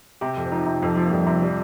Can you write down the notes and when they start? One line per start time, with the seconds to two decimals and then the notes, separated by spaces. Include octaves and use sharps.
0.21 C3 G4
0.37 F2
0.46 C4
0.51 F3 D#4
0.66 C3
0.82 F2 F3
0.96 F3
1.06 A#3
1.11 F2 G3
1.27 C3
1.43 G3